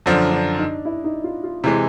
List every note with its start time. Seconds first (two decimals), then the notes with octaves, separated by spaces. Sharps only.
0.06 F#2 D3 F3 D4
0.32 D4
0.58 D#4
0.85 E4
1.04 D#4
1.24 F4
1.44 F4
1.64 C3 E3 G#3 E4